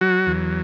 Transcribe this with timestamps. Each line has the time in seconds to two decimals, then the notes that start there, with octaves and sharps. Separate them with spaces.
0.01 F#3 F#4
0.27 E2